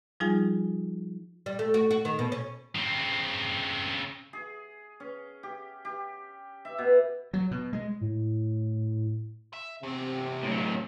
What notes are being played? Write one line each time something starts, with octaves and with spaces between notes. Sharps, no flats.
F3 G3 D#4 F4 G#4 G#5
G3
A3
F#4
F#4
D#3
B2
C#4
C#3 C4
G#4
C#4
G4
G4
E5
B2
F#3
B2
G#3
A2
E5
E2 C3 C4
A2 F#3